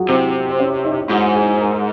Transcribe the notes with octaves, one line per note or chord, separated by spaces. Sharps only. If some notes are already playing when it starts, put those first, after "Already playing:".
Already playing: F#3 F4 F#4 G#4
C3 C4 C5
C5
C#4 C#5
D#4 D#5
G#2 F#4 F#5
G#4 G#5
A#4 A#5